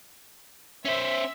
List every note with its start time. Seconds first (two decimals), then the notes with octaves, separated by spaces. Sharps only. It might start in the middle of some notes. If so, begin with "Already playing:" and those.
0.85 C#4 C5 E5